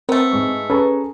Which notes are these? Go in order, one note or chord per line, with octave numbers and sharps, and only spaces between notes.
A3 B3 C4 A#4
G#2 G#3 C#6
C#4 G#4 A4 B4 A#5 C#6